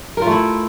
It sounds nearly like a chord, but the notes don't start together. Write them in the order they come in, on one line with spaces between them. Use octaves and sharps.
A#4 F4 A3 E4